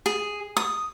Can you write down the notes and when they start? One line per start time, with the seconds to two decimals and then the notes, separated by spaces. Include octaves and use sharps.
0.06 G#4
0.57 D#6